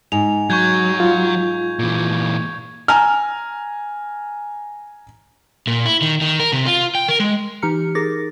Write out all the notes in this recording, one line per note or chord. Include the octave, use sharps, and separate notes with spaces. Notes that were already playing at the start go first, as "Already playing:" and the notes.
G#2 F7
F#3 C#6 G6 G#6
F4
A#2 E3
G#5 A#5 F6
A#2
E4
D#3
D#3
A#4
C3
F4
G5
A#4
G#3
E3 D#4 G4 A#5 F6 C#7
D#4 G#4 A#4 D6 A6 A#6